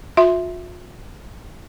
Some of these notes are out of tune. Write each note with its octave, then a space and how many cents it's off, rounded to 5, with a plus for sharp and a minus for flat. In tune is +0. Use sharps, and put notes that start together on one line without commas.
F4 +40 E5 +0 C6 +0